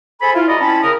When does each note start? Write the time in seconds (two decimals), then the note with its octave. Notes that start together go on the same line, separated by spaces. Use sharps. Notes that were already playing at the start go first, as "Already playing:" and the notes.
0.21 G#4 A4 C5 G#5 B5
0.35 E4 F4
0.48 G#3 F#4 D5 D#5 A#5 B5
0.60 C4 C#4 E4 A5 B5
0.82 C#3 A#4 D#6